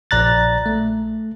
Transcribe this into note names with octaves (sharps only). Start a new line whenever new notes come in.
A#1 D5 A#5 F#6 A6
A3